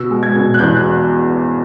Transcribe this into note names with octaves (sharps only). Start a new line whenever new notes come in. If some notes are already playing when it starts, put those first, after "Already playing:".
Already playing: B2 E6
G#3
G#6
B2
F#6
E2 G6